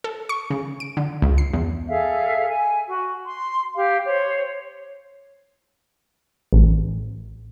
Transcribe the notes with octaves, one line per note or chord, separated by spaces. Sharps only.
A4
C#6
C#3
D7
D3
C#2
C7
E2
G#4 A4 E5 F5
G#5
F#4
C6
G4 F5
C5 C#5
A1